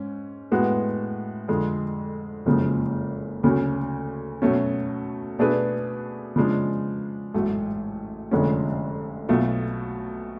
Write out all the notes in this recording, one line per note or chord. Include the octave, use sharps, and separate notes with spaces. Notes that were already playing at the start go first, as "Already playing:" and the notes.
Already playing: G#2 C#4
A2 G#3 B3 F#4
F2 D3 G#3
F#1 F2 C#3 F3 G#3
D2 C#3 F#3 C#4
B2 F#3 A3 C#4
B2 A3 D4 G#4 B4
C#3 F3 G#3 D4
A1 G#2 F#3 A3
F1 F2 D3 G#3 C#4
B1 B2 F#3 A3 F4